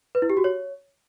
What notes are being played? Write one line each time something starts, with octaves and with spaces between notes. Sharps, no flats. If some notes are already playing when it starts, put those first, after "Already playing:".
B4
E4
G4
F#4
C#5